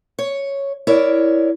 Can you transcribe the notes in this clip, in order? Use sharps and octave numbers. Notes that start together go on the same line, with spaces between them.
C#5
E4 A#4 C#5 D5